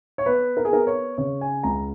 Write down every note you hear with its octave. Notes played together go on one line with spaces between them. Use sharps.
C#5
B3 B4
A#4
G#4
B3 A#4
C#5
C#3 C#5
G#5
C#2 A#5